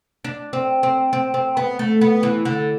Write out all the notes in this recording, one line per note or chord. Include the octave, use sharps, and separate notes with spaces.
D4
C4
C4
C4
C4
B3
A3
B3
E3
D3